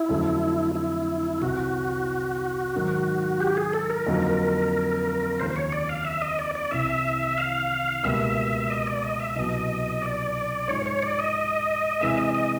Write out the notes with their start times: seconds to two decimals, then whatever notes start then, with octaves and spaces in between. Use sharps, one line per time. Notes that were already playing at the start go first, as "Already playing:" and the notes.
Already playing: E4
0.09 F2 D3 F#3 A3 C#4
0.75 E4
1.41 C2 C3 E3 F#4
2.74 G#2 D#3 F#3
3.40 G4
3.57 G#4
3.73 A4
3.90 A#4
4.06 F2 D3 F#3 A#3 D#4
5.40 D#2 C#3 F3 C5
5.50 C5
5.56 C#5
5.72 D5
5.89 F5
6.05 E5
6.22 D#5
6.39 D5
6.55 D5
6.71 C2 C3 E3 E5
7.38 F5
8.03 C#2 B2 G3 A#3 E5
8.70 D#5
8.87 D5
9.03 D#5
9.20 E5
9.36 C2 B2 F#3 D#5
10.02 D5
10.68 G#2 F3 G#3 C#5
10.86 C#5
11.02 D5
11.19 D#5
12.01 C3 E3 G#3 E5
12.18 D#5
12.35 D#5